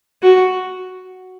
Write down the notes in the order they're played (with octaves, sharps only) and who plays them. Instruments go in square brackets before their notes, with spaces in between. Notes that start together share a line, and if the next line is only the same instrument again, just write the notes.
[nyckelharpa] F#4